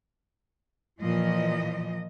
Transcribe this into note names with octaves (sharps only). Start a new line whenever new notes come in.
A#2 E3 F3 D#5